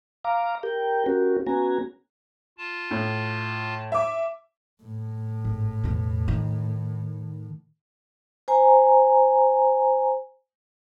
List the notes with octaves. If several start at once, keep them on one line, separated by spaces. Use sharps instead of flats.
F5 A#5 D6
G4 A#4 G5
C#4 F#4 G4 A#4
B3 C#4 F#4 G#5 A#5
F4 A5
A2
E5 D6
A2
G#1
E2 B2
D#3
C5 G#5 A#5